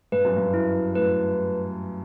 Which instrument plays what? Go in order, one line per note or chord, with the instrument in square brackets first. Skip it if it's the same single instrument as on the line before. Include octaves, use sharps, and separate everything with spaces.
[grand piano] G2 [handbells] B4
[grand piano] F#2
G2
[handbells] E4
[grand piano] A2 [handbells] B4